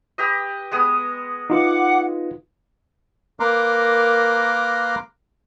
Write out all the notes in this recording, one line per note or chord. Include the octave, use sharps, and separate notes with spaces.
G4 B4 D#5
G#3 B3 D#6
D#4 F4 B4 F#5 D6
A#3 A#4 B4 A#5 C6 D6